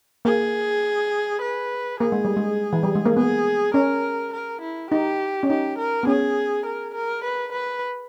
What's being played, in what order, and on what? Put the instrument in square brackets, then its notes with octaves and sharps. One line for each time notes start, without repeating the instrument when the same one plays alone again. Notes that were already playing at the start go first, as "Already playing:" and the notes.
[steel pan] A#3 [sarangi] G#4
[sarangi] B4
[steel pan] A#3 [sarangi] G#4
[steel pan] G#3
G3
G#3
E3
G3
G#3
A#3
[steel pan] B3 [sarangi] G#4
[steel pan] C#4 [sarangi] A#4
[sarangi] A#4
E4
[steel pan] D#4 [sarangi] G4
[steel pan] C#4
[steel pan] D#4 [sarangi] G4
[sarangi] A#4
[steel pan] B3
[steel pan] C#4 [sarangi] G#4
[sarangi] A#4
A#4
B4
B4